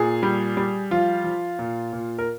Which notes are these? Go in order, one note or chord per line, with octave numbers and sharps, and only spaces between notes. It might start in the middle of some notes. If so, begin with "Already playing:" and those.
Already playing: A#2 G#4
G3
G3
F3 F4
F3
A#2
A#2
A#4